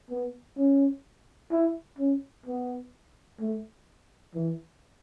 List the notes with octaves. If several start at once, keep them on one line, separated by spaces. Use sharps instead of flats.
B3
C#4
E4
C#4
B3
A3
E3